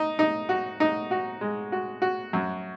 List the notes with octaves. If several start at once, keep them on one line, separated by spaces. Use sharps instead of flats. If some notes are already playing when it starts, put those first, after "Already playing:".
Already playing: D#4
D#4
F#4
D#4
F#4
G#3
F#4
F#4
F#2